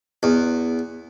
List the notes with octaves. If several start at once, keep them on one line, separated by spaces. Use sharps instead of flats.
E2